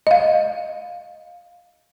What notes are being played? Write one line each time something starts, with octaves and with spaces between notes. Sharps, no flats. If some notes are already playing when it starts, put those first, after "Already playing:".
D#5 F5